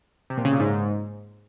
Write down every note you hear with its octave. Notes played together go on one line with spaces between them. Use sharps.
C3
A#2
C#3
A#2
G#2